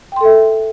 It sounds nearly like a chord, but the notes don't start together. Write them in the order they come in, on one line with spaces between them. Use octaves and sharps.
G5 C6 A4 E5